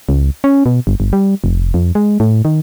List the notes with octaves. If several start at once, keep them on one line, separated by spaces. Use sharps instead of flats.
C#2
C#4
B2
G1
G1
G3
F1
F2
G#3
A2
D#3